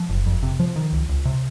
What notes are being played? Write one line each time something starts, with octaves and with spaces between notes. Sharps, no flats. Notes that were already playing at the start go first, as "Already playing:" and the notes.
Already playing: F3
F#1
F2
C3
F3
D#3
C#2
C#2
C3